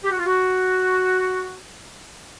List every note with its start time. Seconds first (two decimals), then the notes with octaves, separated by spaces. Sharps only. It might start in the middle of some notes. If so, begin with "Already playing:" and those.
0.04 G4
0.11 F#4
0.19 F4
0.26 F#4